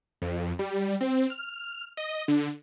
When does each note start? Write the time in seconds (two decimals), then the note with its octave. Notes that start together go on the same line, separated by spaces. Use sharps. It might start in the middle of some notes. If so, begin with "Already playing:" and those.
0.22 F2
0.59 G3
1.01 C4
1.30 F6
1.97 D#5
2.28 D3